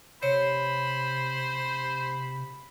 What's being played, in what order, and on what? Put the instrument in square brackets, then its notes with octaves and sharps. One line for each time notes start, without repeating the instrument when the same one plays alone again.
[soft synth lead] C3 [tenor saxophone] C5 [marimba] C#5 [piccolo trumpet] B5